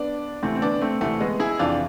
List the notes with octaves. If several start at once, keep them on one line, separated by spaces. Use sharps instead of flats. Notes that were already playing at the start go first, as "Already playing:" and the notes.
Already playing: B3 D4
D2 C3 E3 A3 C4
C4
B3 D4
A3 C4
D2 C3 E3 A3
G#3 B3
E4 G#4
F2 C3 E3 D4 F4